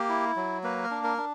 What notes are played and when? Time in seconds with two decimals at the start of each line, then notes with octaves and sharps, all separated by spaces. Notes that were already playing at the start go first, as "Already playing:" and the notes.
Already playing: A#3 G4
0.09 E4
0.36 F#3
0.63 A#3 B4
0.83 A#4
0.91 D4
1.04 A#4
1.18 D4